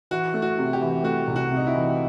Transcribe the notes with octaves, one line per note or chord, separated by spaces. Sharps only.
E3 F#4
A3
F#4
C3
G4
E3
A3 F#4
C2
F#4
C3
D#4
E4
E3